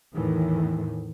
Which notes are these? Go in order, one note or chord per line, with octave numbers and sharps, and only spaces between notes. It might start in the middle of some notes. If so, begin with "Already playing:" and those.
E2 A2 D#3 E3